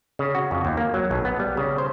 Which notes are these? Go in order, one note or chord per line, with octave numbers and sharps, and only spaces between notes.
C#3
F#4
F2
D#2
A#3
F#3
B1
B3
G3
C#3
C5